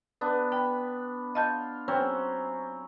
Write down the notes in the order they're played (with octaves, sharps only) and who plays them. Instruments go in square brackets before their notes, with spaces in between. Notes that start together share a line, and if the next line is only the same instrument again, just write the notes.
[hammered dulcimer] B3 D4
[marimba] G5 [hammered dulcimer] B5
[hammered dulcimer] F4 [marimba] D#5 A5 G6
[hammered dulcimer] F#3 C4 C#4